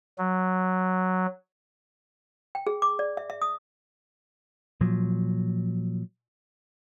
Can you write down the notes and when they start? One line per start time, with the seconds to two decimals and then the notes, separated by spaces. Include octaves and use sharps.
0.18 F#3
2.55 G5
2.67 G#4
2.82 D6
2.99 D5
3.17 E5
3.30 E5
3.42 D#6
4.81 A#2 F3 F#3